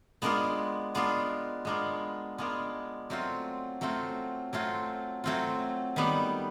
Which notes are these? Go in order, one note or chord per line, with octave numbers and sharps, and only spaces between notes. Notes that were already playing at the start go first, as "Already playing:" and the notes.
G#3 B3 D4 F4 A#4
G#3 B3 D4 F4 A#4
G#3 B3 D4 F4 A#4
G#3 B3 D4 F4 A#4
F#3 A3 C4 F4
F#3 A3 C4 F4
F#3 A3 C4 F4
F#3 A3 C4 F4
D#3 G3 B3